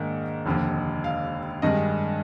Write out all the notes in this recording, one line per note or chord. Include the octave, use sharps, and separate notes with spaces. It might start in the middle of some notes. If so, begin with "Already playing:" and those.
Already playing: G#2 D#3 A#3 D4
F1 D#2 D3
F5
G2 D#3 G#3 D#5